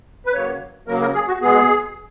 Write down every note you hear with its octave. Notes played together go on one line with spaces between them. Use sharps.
B4
C#3 F#3 A#3 C#5
C#3 F#3 A#3 A#4
A#4
G#4
F#4
B2 G#3 B3 G#4